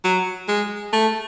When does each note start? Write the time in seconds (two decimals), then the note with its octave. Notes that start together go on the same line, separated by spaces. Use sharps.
0.05 F#3
0.48 G#3
0.93 A3